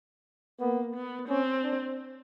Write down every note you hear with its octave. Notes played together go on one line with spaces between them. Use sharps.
A#3 B3
B3
C4 C#4
D4